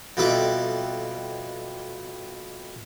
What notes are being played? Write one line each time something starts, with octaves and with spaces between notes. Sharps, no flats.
F2 B2 G3 A4 E5 D6